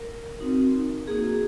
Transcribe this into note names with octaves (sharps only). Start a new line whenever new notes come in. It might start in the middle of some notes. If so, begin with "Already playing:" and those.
Already playing: A#4
C4 D#4 F#4
A#3 D#4 F#4 G#4